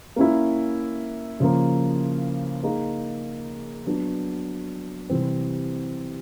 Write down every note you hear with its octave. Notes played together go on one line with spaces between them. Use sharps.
A#3 C#4 E4
C#3 F3 A#3
A#3 D#4 G#4
F#3 B3 D4
C3 E3 G3 C4